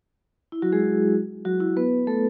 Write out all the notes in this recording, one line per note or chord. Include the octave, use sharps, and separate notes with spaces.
E4
F#3 F#4
G#3 G#4
F#3 F#4
E4
B3 B4
A3 A4